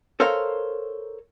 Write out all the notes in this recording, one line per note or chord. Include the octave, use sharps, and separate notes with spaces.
A4 A#4 C5 C#5 F5